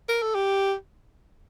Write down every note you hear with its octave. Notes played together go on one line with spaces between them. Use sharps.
A#4
A4
G4